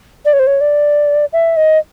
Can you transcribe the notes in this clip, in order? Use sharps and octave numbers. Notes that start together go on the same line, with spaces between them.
D5
C#5
C5
C#5
D5
E5
D#5